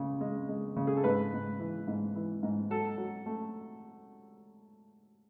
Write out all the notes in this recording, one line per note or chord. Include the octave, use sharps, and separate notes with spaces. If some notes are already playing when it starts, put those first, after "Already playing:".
Already playing: C#2 C#3
G#3
G#3
C#3
G#4
A4
G#2 B4
G#2
E3
G#2
E3
G#2
F#3 A4
F#3
A3